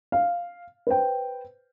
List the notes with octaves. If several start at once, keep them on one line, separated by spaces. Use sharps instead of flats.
F5
B4 C5 G5